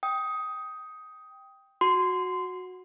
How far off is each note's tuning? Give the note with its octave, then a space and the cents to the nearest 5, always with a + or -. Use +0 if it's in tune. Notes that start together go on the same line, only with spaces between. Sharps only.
G5 +0 D#6 +15
F#4 -10 C6 -20